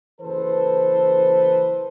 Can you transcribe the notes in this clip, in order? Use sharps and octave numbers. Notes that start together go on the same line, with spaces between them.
F#1 E3 A4 B4 C5